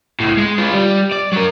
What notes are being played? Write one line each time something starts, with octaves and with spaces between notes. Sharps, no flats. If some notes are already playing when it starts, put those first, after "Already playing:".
C#2 A2
G#3
F4 B4
G3
D5
F#3 A#4